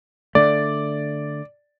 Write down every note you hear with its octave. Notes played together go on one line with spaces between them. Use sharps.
D3 A3 D5